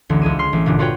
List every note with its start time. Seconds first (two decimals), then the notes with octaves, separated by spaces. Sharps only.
0.09 A1 D2 D3
0.22 C#2 G#3 G#4 D#7
0.39 C6 F6 C7
0.53 A1
0.66 G1 A#2 D3
0.79 F4 F#4 B4 C#5 G5